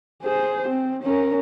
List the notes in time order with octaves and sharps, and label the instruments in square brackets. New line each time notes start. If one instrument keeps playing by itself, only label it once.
[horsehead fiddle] G#4 C5
C4
C#4 A#4